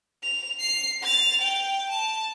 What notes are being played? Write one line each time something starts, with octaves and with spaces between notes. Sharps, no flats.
F7
C7
A6 F7
G5
A5